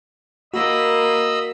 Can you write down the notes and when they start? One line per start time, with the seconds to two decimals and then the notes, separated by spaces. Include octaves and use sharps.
0.54 A#3 F#4 A#4 D#5 B5 E6